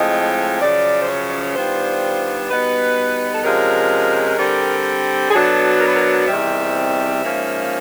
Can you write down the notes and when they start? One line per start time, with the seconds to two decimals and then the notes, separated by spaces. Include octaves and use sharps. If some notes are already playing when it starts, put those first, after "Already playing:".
Already playing: A2 F3 G#3 C4 D#5
0.60 F#2 C#3 F3 D5
1.01 C5
1.07 C#5
1.30 D5
1.42 C#5
1.54 D#3 G3 B3 D4 F4 C5
2.49 B2 G3 B3 D#4 B4
3.31 A4
3.43 C3 F3 G#3 C#4 A#4
4.38 D3 G3 C4
5.29 G#4
5.32 B2 F#3 B3 D4 A4
5.79 A#4
5.87 B4
5.94 A#4
6.26 E2 C3 D#3 G3 C4 E5
7.21 G#2 F3 A#3 C#4